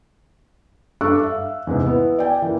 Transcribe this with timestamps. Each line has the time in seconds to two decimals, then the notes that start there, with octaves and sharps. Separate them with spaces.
1.01 G2 A4 C#6 D6 E6 F#6
1.23 E5 F5
1.67 E2 G#2 C3
1.86 B3 E4
2.19 D5 G5 G#5
2.42 E3 A#3